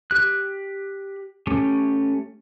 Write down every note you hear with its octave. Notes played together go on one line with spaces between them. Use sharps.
G4 F#6
A3 C#4 G4